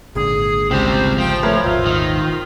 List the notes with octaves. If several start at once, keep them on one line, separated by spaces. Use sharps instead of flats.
G#1 A#2 D3 G#4
C#2 C3 G3 C5
F3 G5
A3 A#4 B4 C#5
D#1 G#1 F4 C5 E5
D#3